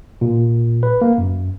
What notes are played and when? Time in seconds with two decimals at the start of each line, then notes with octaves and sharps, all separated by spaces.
0.21 A#2
0.83 B4
1.01 A#3
1.18 F#2